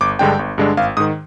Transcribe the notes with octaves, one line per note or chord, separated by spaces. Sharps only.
G1 D6
G2 D3 G#3 D4 G5
G1
G2 D3 G#3 D4
G#1 F5
G#2 D#3 D#6